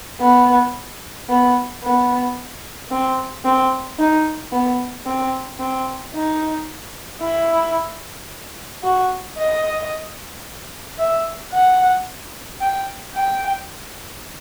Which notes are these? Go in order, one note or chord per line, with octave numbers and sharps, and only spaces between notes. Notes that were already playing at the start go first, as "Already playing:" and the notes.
B3
B3
B3
C4
C4
D#4
B3
C4
C4
D#4
E4
F#4
D#5
E5
F#5
G5
G5